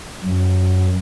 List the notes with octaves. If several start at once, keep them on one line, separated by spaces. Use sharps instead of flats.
F#2